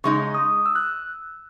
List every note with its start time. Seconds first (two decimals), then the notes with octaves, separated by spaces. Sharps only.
0.04 C#3 G#3 D#4 C#6
0.35 D#6
0.66 E6
0.75 F#6